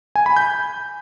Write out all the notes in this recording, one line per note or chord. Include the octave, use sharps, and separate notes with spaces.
G#5
B5
G6